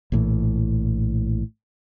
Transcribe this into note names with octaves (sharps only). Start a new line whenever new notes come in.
A#1 A2 E3